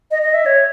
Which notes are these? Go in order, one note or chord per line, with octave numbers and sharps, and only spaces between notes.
D#5
D#5
E5
C#5